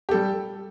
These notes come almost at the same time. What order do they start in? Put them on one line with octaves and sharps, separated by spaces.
G4 A4 G3